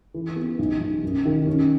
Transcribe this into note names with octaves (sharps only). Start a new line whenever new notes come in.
E3
B3
B1
B1
F#2
D#3
C#4